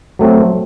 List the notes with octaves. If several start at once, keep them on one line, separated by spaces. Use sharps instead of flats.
F#3 A3 C4